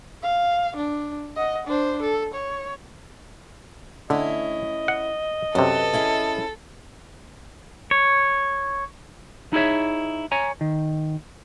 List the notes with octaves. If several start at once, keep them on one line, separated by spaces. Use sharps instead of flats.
F5
D4
D#5 F#5
D4 C5
A4
C#5
D3 A3 C#4 E4 D#5
F#5
F#2 C3 B3 A4
C#4 E4 G#4
C#5
D#4 E4 G#4 C#5 E5
C#5 G#5 A#5
D#3